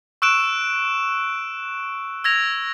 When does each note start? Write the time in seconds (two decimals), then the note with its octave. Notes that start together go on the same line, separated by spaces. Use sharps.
0.22 C#6 E6 F#6 D7 E7
2.24 E6 G#6 A#6 F7